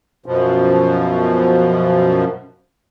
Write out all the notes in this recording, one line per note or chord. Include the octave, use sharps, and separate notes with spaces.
F#2 B2 F3